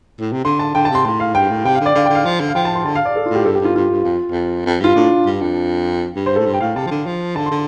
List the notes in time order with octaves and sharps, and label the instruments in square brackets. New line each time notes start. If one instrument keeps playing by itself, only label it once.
[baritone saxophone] A2
C3
[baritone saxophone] D3 [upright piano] C6
[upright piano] A5
[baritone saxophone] D3 [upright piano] G5
[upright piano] A5
[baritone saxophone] C3 [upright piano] C6
[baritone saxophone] A2 [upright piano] C6
[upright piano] F5
[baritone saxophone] G2 [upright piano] G5
[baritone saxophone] A2
[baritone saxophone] C3 [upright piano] G5
[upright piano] F5
[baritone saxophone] D3
[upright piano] D5
[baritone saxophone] D3 [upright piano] F5
[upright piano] G5
[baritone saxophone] D3
[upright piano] F5
[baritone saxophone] F3
D3
[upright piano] F5
[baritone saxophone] F3 [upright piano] G5
[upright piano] A5
C6
[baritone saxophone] D3 [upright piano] A5
[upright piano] F5
D5
A4
F4
[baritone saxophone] A2 [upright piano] G4
[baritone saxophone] G2 [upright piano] A4
[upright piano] G4
[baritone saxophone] G2 [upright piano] F4
[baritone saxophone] G2 [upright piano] F4
[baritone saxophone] G2
F2
F2
F2
[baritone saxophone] G2 [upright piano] F4
[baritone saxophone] A2 [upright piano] D4
[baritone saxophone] G2
F2
G2
[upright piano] C5
A4
[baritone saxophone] A2
G2
[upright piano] G5
[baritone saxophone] A2 [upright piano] F5
[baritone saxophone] C3 [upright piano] A5
[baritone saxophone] F3
D3
F3
[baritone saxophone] D3 [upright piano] A5
[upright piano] C6
[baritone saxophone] D3